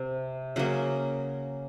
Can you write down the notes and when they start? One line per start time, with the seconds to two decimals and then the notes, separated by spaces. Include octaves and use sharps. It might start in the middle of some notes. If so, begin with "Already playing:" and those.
Already playing: C3
0.56 C#3 F#3 A#3